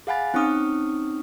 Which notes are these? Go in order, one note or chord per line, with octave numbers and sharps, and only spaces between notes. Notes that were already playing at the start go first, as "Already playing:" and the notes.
G#4 F5 F#5 G#5 B5 A6
C4 C#4 D#4 C#6 D#6 F6